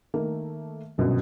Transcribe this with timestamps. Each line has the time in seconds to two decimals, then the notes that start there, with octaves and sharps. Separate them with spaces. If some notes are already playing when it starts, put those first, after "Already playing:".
0.14 D#3 A3 A#3
0.98 G1 C2 F#2 B2